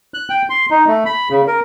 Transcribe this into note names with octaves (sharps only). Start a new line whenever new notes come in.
F#6
G5
C6
D#4
A3
B5
C#3
A#4